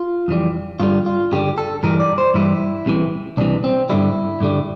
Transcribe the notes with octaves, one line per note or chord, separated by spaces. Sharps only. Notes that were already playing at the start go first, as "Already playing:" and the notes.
Already playing: F4
F2 E3 G3
G2 D3 G3 F4
F4
G2 D3 G3 G4
A4
G2 E3 G3 A#4
D5
C5
G2 E3 G3 E4
C2 C3 E3
C2 C3 E3 D4
C4
G2 D3 G3 E4
G2 D3 G3